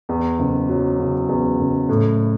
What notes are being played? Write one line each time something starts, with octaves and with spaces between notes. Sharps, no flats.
E2
F#1
F#3
C#3
E2
F#1
A2